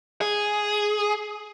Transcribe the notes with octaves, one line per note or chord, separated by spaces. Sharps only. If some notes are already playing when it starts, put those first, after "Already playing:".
G#4